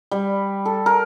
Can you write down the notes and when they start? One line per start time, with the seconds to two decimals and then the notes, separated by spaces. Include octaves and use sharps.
0.11 G3
0.65 A4
0.86 A#4